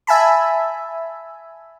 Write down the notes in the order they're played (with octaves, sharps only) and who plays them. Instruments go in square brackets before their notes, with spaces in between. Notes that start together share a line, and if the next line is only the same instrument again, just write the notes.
[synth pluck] E5 G#5 A5 B5